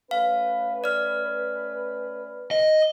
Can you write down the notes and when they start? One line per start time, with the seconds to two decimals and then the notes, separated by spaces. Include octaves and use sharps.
0.11 A3 C#4 B4 F5
0.84 D5 F6
2.51 D#5